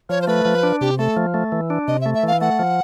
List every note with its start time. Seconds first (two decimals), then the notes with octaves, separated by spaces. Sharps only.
0.09 F3 C#5
0.22 C5
0.28 A3 B4
0.45 F3
0.63 D4
0.81 C3 G4
0.99 A3 A4
1.17 F3
1.34 A3
1.52 E3
1.70 D4
1.88 C3 D#5
2.01 E5
2.06 A3
2.14 E5
2.23 E3 F5
2.41 A3 F#5
2.59 F3